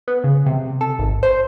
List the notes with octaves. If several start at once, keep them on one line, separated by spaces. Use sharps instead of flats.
B3
C#3
C3
A4
G#1
C5